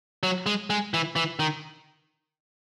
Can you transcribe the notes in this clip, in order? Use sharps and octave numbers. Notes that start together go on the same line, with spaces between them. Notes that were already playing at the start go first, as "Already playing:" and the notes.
F#3
G#3
G#3
E3
E3
D#3